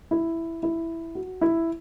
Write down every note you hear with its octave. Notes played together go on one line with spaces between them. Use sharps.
E4
E4
F#4
E4